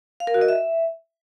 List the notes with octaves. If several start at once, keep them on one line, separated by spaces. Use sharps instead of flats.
F5
A#4
F#4
D#5
E5